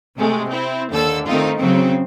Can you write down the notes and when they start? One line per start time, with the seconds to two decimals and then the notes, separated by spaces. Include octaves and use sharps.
0.17 C3 G#3 A3
0.49 C4 E4
0.90 D#2 D3 A4 E6
1.27 D#3 A3 C4 D#4 F4
1.58 C#3 F#3 C4